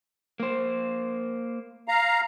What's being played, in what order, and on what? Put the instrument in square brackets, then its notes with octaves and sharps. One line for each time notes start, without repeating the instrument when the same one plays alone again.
[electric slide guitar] A#3 C5
[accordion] F5 A#5